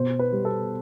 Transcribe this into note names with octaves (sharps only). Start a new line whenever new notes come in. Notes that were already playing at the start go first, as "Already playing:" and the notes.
Already playing: B2 C5
B4
G3
A4